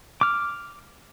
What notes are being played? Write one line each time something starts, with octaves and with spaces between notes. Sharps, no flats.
D6 F6